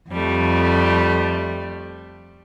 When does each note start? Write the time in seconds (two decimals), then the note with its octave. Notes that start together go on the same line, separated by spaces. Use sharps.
0.10 F2 G3 A3